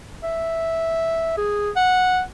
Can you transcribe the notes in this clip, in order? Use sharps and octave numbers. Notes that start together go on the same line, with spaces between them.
E5
G#4
F#5